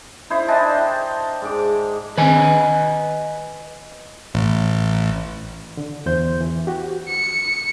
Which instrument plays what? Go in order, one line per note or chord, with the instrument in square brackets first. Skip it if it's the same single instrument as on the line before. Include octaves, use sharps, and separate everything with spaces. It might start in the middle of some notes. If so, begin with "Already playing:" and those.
[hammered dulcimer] D#4 E4 C5
D4 D#4 G#5 A5
G5
G#2 D6
[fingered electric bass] D#3 C4 [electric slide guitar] B4 D#5 G#5
[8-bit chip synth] A1
[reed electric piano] D3
E2 C5 G6
E3
F#4 G4
[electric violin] C#7